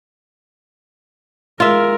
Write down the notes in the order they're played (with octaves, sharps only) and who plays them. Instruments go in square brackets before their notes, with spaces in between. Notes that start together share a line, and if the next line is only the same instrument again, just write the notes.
[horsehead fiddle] G#3 A#4 [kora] F4 E5